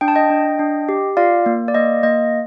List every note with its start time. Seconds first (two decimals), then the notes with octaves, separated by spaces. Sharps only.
0.01 D4 G5
0.08 A5
0.15 D#5 G5
0.30 D4
0.59 D4
0.89 G4
1.17 F4 D5 F5
1.46 A#3
1.68 D5
1.75 A#3 D#5
2.03 A#3 D#5